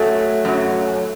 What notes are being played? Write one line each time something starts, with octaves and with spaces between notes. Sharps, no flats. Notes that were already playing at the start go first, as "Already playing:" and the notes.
Already playing: F#2 F#3 A3
F#2 F#3